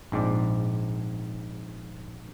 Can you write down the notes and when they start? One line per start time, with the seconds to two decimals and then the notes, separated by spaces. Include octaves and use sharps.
0.12 A#1 G#2 C4 D5